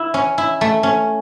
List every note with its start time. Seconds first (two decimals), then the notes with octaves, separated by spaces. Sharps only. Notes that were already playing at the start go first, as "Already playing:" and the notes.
Already playing: E4
0.14 C#4
0.38 E4
0.61 A3
0.83 C#4